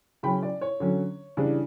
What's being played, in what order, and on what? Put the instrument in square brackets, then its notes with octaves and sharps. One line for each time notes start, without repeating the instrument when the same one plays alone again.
[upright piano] C#3 F#3 C#4 G5 B5
D5
C#5
D3 F#3 C#4
C#3 E3 G3 D4